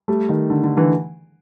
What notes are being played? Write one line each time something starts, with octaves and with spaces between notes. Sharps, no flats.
G3 A3
D#3
D3
D3
D3 E3